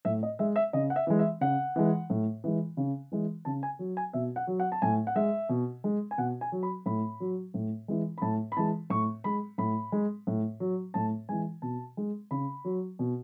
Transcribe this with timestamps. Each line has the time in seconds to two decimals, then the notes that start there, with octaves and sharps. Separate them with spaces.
0.05 A2 E5
0.23 D#5
0.39 G#3 E5
0.56 E5
0.73 C#3 D#5
0.90 F#5
0.96 E5
1.07 E3 G#3
1.19 E5
1.41 C#3 F#5
1.76 E3 G#3
2.10 A2
2.44 E3 G#3
2.77 C#3
3.12 E3 G#3
3.45 C#3 A5
3.63 G#5
3.79 F#3
3.97 G#5
4.13 B2 E5
4.36 F#5
4.47 F#3
4.60 F#5
4.72 A5
4.82 A2 G#5
5.07 F#5
5.15 G#3 E5
5.49 B2
5.84 G#3
6.11 G#5
6.18 B2 F#5
6.41 G#5
6.52 F#3
6.63 B5
6.86 A2 B5
7.20 F#3
7.54 A2
7.88 E3 G#3
8.18 B5
8.22 A2 A5
8.52 B5
8.57 E3 G#3 A5
8.90 A2 C#6
9.24 G#3 B5
9.58 A2 B5
9.92 G#3
10.27 A2
10.60 F#3
10.94 A2 A5
11.29 E3 G#3 G#5
11.62 B2 A5
11.97 G#3
12.31 C#3 B5
12.65 F#3
12.99 B2